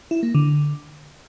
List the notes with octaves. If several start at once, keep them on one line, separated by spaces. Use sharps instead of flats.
E4
A#3
D3